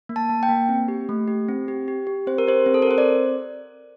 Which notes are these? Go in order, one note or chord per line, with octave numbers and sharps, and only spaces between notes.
A#3
A5
A#3
G5
A#3
C4
G4
A3
G4
C4
G4
G4
G4
C4 C5
A#4
G4 C5
C4
A4
A#4
C4 C5
D5